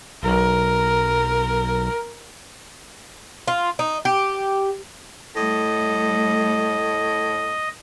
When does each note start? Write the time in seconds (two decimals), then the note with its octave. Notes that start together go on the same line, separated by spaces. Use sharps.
0.23 B1 A#4
3.48 F4
3.79 D#4
4.05 G4
5.36 A2 G3 A3 D#5